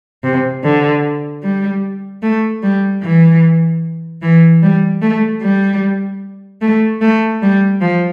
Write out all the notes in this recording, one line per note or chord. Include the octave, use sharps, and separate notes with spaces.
C3
D3
G3
A3
G3
E3
E3
G3
A3
G3
A3
A3
G3
F3